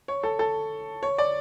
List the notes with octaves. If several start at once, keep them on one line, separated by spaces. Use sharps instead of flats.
C#5
A4
A4
C#5
D5